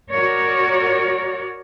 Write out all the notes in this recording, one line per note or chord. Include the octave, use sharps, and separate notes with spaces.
F#4 A#4 C#5 D5